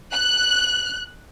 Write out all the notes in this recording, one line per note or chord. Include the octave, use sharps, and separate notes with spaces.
F#6